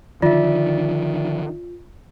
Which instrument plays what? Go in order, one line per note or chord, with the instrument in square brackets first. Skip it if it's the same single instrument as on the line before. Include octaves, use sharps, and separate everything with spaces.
[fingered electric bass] D3 D#3 F3 [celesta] F4 [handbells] D5 E5